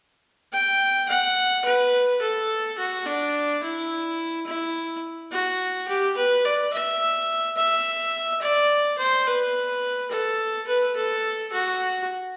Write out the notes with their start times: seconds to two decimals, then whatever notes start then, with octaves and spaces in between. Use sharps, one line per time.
0.53 G5
1.09 F#5
1.65 B4
2.22 A4
2.78 F#4
3.06 D4
3.63 E4
4.47 E4
5.32 F#4
5.88 G4
6.17 B4
6.45 D5
6.73 E5
7.57 E5
8.42 D5
8.98 C5
9.27 B4
10.11 A4
10.67 B4
10.96 A4
11.53 F#4